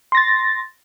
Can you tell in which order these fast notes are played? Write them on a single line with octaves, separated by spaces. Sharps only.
C6 A#6 A6